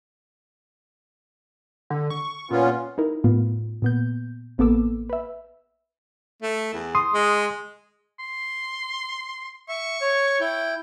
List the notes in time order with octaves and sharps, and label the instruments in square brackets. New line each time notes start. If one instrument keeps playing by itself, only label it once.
[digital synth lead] D3
C#6
[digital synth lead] A#2 [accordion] B3 C#4 F4
[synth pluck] D#4 E4 A#4
A2 B3 F4
A#2 B3 G6
A1 A#3 B3 A4 D6 E6
B4 E5
[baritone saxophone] A3
E2
[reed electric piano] C6 D#6
[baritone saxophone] G#3
[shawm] C6
[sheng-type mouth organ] E5 [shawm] C#6
[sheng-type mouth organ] C#5
[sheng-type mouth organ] E4 [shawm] G5